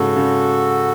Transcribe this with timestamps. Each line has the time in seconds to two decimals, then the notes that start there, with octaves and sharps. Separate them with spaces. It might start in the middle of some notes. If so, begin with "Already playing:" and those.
Already playing: G#2 C#3 F#4 A4
0.16 C#3